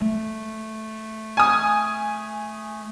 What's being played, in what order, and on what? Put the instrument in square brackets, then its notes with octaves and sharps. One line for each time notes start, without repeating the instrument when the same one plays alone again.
[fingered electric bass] A3
[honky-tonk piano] G#5 D#6